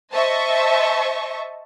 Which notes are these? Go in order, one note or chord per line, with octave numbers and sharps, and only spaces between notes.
C5 D#5 E5 A5 C#6